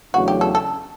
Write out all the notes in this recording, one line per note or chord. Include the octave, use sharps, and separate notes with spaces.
E2 C#3 F#3 A3 D4 F#4
G4
A4
A4